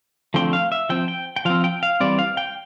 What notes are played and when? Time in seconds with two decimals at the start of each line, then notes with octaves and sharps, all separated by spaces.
0.34 D3 F3 A3 C4 G5
0.53 F5
0.72 E5
0.89 F3 C4 G5
1.08 G5
1.36 G5
1.45 F3 C4 F5
1.64 G5
1.83 F5
2.00 E3 G3 C4 D5
2.19 F5
2.37 G5